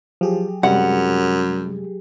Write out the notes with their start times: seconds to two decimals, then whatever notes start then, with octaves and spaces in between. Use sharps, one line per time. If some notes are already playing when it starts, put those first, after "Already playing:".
0.21 F3 F#3 G4 G#4
0.63 F#2 C3 G3 G#3 F#5